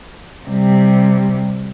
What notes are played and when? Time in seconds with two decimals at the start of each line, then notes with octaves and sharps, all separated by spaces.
0.49 C3 G3